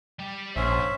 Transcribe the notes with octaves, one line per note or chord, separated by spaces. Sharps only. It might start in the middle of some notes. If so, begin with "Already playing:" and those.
G3 G4
A#1 G#2 C#4 C5 E5